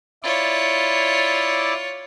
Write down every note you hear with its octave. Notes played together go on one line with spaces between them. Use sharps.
E4 F4 C#5 D5